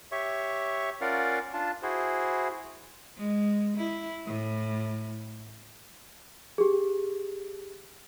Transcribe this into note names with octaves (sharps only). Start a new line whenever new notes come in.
G4 C#5 E5 C#6
C#4 F4 A#4 D5 F5 F#5
D4 F4 A5
E4 F#4 G#4 C5
G#3
E4
A2
G4 G#4